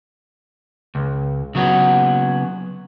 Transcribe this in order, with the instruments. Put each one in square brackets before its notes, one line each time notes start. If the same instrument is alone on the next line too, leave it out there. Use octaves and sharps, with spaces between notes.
[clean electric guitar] C#2
C#3 F#3 B3 F#4